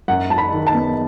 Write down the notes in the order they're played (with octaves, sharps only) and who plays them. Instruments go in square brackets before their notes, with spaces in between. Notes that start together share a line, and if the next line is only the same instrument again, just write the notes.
[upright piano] F#2 F#5
F#3 A5
B5
D#3
A5
B3